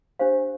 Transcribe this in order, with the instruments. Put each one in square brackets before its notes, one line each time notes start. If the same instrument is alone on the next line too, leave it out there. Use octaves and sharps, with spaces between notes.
[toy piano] D4 G4 C5 F5